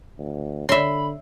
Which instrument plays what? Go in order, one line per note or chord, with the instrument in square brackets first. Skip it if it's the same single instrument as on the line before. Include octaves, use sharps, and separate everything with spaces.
[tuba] D2
[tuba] D3 [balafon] C#5 [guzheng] E5 C6 [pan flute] B5